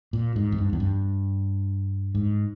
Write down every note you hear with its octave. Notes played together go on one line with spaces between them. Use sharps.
A#2
G#2
E2
G2
E2
G2
G#2